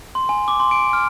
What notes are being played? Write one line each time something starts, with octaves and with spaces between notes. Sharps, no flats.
C6
G#5
D6
C6
D7
F6